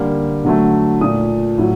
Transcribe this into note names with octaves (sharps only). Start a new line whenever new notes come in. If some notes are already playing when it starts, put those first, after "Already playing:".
Already playing: D3 G3 A#3
D3 F#3 A3
A#2 A3 D#6
A2 F#3